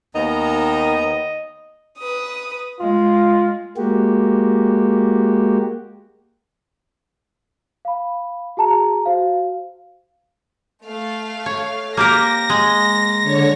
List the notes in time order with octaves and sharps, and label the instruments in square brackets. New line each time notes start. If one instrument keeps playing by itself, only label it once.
[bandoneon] D#2 B3 A#5 [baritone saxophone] D#3 [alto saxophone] D#5
[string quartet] B4 D#6
[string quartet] G#3 [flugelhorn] F4
[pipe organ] G#3 A#3 F#4 G4
[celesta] F5 B5
F#4 G#4 A5 A#5
F#4 C5 F5
[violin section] A3 F5
[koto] C#5
[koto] A#3 G4 A#4 [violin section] A#6
[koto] G#3
[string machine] D3 C#5